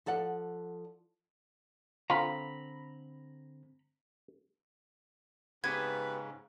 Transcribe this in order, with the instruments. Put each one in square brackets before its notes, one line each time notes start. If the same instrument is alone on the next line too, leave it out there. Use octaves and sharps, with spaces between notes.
[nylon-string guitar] F3 A4 D5 F#5
[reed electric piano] D3 C4 [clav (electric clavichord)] F4 [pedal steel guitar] A#5 B5
[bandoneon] G#2 C#3 [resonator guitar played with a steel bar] B3 C4 G4 [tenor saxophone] B4 [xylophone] G#6